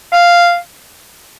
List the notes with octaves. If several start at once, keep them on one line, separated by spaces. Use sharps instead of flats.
F5